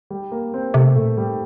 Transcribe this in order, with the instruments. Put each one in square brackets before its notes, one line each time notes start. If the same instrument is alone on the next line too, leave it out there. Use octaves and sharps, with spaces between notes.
[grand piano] G3
A#3
C4
[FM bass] C3 [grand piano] A3
[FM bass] A#2 [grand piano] A3
[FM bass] A2 [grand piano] G3